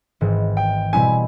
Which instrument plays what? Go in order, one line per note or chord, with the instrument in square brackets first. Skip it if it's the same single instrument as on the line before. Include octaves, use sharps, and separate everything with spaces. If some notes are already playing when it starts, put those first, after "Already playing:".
[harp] G#1 G#2 E3
[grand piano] G5
[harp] B2 G3 C4 E4 [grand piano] G#5